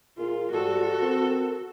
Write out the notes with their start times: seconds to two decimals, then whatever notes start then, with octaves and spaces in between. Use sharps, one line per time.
0.18 A#2 F4 G#4 A#4
0.52 G#2 G3 F#4 A4
1.02 C4 A#4